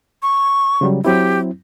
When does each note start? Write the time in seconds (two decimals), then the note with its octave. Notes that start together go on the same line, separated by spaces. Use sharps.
0.22 C#6
0.81 C#3 F#3 G3
1.05 F#3 C4 E4 G4